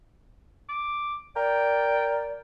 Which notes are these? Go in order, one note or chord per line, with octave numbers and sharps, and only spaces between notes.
D6
A#4 D5 G5